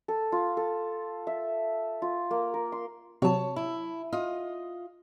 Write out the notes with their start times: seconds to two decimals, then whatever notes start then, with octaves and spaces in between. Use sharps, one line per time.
0.08 A4
0.32 F4
0.57 A4
1.27 E5
2.02 F4
2.31 A#3
2.54 A#4
2.72 C6
3.22 C3 F#3 C#5 A5
3.56 E4
4.12 F4 D#5